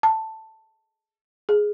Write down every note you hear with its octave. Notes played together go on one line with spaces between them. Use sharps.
A5
G#4